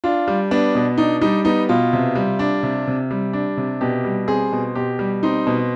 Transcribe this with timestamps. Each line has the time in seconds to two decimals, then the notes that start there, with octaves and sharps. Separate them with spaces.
0.04 D4 F4
0.28 G3
0.51 B3 D4
0.75 B2
0.98 D4 D#4
1.21 G3 D#4
1.45 B3 D#4
1.69 B2 F4
1.93 C3
2.15 G3
2.39 D4
2.63 C3
2.87 C3
3.11 G3
3.33 D4
3.57 C3
3.81 B2 G4
4.05 G3
4.28 C4 G#4
4.52 B2
4.75 B2 G4
4.99 G3
5.23 C4 D#4
5.47 B2